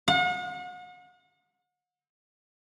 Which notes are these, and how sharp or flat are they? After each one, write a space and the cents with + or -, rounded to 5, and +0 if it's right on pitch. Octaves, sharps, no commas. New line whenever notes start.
F#5 -40